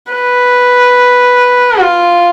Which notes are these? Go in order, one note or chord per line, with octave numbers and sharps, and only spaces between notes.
B4
F4